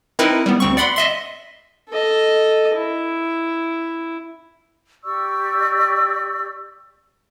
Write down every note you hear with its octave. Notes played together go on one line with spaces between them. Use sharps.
C4 D#4 E4 A#4 B4
G3 B3
D2 C4 C#6
D5 F#5 B5 C6
D#5 E5 C6
A4 D#5
E4
G4 D5 C#6 E6